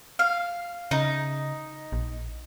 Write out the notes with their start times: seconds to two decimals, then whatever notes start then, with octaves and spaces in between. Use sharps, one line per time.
0.19 F5
0.91 C#3 D#4
1.92 A#1